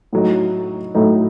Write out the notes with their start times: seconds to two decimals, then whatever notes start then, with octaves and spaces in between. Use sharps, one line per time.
0.13 A2 F#3 A3 D#4
0.95 A2 F#3 A3 D#4